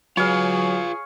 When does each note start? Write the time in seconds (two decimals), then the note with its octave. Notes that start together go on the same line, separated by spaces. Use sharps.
0.17 F#3 F4 G#4 B4 C#5 F5